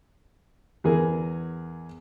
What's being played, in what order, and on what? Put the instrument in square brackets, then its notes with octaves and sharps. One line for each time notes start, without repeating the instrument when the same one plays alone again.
[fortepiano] E2 G#4 A#4